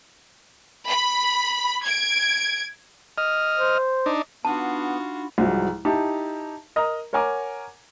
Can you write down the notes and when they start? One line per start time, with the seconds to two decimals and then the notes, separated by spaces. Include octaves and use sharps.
0.88 B5
1.85 G#6 D7
3.18 D#5 F6
3.56 C5
4.06 D4 D#4
4.45 B3 D4 D#4 F4 F#4 A5 B5
5.38 C2 G#2 F3 F#3 G#3
5.85 D#4 E4 G4 A5
6.76 A#4 D#5 A#5 D#6
7.13 A#4 C#5 F#5 G#5 A#5 D6